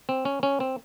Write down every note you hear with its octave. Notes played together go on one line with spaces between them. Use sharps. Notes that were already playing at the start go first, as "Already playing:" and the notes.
C4
C#4
C#4
C4